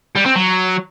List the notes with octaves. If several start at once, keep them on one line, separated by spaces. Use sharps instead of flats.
G3
C4
F#3